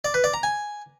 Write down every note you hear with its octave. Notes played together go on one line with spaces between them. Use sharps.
D5
B4
D5
A#5
G#5